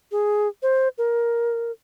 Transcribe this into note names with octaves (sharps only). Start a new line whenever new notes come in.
G#4
C5
A#4